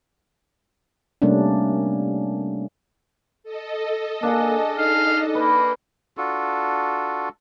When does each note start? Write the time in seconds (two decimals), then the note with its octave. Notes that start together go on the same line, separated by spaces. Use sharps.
1.22 C3 G3 A3 A#3 C#4 D4
3.43 A4 D#5
4.23 A#3 D4 G#4
4.78 D#4 F5
5.35 A#3 B4
6.17 D4 F4 F#4 A4